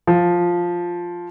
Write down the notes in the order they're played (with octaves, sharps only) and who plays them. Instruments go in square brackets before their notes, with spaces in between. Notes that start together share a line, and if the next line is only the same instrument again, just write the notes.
[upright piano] F3